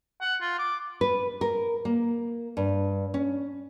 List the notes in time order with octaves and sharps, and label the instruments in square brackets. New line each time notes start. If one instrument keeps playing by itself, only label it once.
[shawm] F#5
F4
D6
[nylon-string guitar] B4
A#4
A#3
G2
C#4